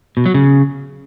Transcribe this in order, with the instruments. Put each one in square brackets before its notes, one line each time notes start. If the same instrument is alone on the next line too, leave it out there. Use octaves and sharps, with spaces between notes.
[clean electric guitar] B2
F#3
C#3